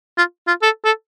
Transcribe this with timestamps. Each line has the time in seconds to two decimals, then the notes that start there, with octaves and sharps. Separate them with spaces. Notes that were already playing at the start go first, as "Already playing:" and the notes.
0.18 F4
0.47 F4
0.62 A4
0.85 A4